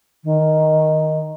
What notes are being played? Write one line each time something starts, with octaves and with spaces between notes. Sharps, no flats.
D#3